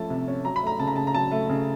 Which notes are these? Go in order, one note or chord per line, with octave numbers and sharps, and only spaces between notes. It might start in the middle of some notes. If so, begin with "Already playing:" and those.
Already playing: F3 A3 C#4 A5
C3
C#4
F#3 A#5
B5
A3 A#5
C#3 A5
A#5
C#3 A5
A#5
F#3 A5
A3
C#3